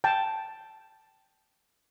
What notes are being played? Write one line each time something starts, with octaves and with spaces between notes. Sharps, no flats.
G5 A5